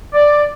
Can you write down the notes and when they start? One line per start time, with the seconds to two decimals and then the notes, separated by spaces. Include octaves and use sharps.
0.14 D5